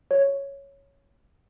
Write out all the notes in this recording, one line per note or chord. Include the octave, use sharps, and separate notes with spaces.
C#5